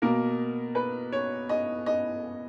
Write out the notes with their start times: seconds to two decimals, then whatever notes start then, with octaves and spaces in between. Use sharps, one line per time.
0.02 B2 A#3 A#4
0.75 B4
1.12 C#5
1.49 D#5
1.86 D#5